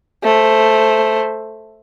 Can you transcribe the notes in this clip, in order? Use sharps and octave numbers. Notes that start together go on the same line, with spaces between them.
A3 C5